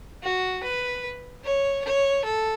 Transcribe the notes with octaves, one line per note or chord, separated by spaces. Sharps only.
F#4
B4
C#5
C#5
A4